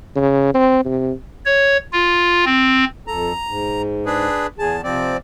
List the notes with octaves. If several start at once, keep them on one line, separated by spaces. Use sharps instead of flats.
C#3
C4
C3
C#5
F4
C4
F2 A4 A#5
G#2
D4 G#4 B4
E2 G#4 A5
C3 F3 C4 D5